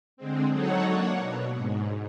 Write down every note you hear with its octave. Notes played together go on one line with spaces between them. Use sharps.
D3 G#3 C4
F#3 D#4 A4 C#5 F#5
A#3 D4 C#5 F#5
B2
G#2